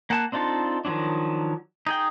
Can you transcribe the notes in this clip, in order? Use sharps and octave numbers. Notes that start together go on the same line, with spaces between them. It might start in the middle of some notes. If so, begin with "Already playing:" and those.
A#3 F#5 G#5 A5 F#6
C4 D4 D#4 F4 A4
D#3 F3 F#3 C#4 D4
D#4 G#4 G5